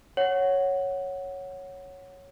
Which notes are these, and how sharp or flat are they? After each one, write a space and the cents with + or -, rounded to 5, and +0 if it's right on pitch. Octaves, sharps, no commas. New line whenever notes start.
C#5 +0 F#5 +0